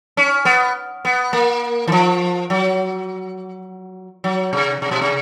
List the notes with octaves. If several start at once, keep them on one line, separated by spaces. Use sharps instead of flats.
C#4
B3
B3
A#3
E3
F3
F#3
F#3
C3
C3
B2
C3